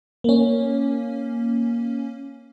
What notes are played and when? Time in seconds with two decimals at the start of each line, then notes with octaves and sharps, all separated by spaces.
0.24 A#3 C#4